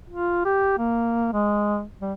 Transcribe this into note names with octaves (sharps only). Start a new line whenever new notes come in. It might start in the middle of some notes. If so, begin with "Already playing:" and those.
F4
G4
A#3
G#3
G3